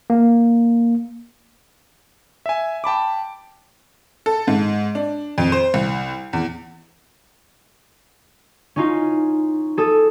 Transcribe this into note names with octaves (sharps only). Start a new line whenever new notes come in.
A#3
E5 G#5
G5 A5 B5 D6
A4
G#2
D4
F2
C5
C2
E2
C#4 D#4 F4
G#4 A4 D#6 E6